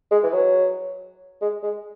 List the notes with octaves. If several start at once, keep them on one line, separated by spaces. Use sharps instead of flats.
G#3
E3
F#3
G#3
G#3